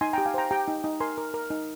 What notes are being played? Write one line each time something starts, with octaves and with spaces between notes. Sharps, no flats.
D#4 G#5 C6
G5 A#5
G4
F5 G#5
C5 G5 A#5
G4 G5 A#5
D#4
D#4
A#4 G#5 C6
A#4
A#4
D#4